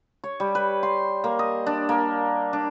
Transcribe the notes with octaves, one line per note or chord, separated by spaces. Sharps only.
C#5
G3
B4
C6
A#3
D#5
D4
A#3
D4